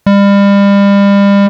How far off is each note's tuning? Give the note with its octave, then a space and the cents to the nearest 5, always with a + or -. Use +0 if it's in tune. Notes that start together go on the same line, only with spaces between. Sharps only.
G3 +35